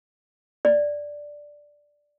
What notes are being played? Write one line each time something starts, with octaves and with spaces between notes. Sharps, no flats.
D5